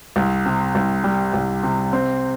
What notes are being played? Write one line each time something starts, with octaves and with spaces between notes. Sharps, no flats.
C2
C3
C2
G3
C2
C3
C4